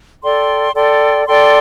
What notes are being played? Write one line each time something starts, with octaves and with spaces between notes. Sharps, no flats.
A4 D5 G5 C6
A4 D5 G5 C6
A4 D5 G5 C6